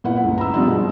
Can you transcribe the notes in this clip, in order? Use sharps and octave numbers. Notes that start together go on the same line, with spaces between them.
A#2 E4 B4 F#5
G1 C#2
A#5 B5 E6
F3 G3 B3 C4 D4 F4
G#2 B2 G#3